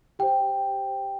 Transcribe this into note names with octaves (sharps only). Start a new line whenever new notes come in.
G4 C5 G5